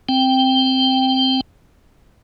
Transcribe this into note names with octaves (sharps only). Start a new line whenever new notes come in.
C4 G5